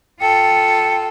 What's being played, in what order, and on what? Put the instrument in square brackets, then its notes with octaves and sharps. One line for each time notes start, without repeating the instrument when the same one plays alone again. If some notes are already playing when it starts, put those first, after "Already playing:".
[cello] F4 A4 [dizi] G5 [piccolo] C#7